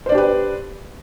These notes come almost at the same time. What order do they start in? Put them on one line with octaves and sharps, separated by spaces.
C5 D5 D4 G4 B4